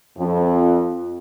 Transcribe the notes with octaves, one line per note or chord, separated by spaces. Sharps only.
F2